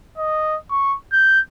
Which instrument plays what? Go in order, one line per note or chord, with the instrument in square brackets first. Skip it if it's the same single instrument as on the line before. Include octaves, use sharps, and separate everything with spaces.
[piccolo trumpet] D#5
C#6
G6